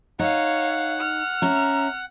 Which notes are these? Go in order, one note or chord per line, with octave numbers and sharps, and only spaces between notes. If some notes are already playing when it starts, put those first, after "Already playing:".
D#4 C#5 F5 F#5
F6
C#4 E5 A#5